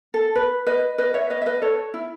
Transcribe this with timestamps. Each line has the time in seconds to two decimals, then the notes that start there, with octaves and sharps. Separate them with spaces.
0.14 A4
0.35 B4
0.66 B4 D#5
0.98 B4 D#5
1.14 C#5 E5
1.30 B4 D#5
1.42 E5
1.46 B4 D#5
1.62 A4 C#5
1.94 E4